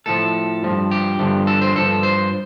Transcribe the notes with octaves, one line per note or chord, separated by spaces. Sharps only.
A2 F3 A4
G2 F3
G4
G2 D3 F3
A4
C5
G2 F3 A4
C5